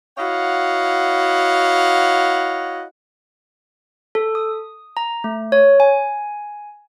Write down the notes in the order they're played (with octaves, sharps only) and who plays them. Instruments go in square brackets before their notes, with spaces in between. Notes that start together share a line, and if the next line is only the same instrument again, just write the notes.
[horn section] E4 F#4 C#5 D#5 F5 F#5
[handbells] A4
D#6
A#5
A3
C#5
G#5